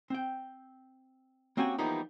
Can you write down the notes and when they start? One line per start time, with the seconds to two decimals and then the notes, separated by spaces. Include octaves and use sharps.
0.10 C4 G5
1.57 A#3 C4 C#4 F#4 G4 G#5
1.78 E3 F3 G3 A#3 B3 D#4